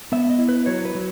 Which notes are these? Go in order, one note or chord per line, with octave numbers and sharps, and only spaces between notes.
B3 E5
D#5
E4
B4
F#3 C#5
B4
F#3